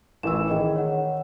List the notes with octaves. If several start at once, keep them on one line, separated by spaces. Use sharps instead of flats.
A1 E3 E6 E7
D#3 G#4 D#5 G5
C#5 F#5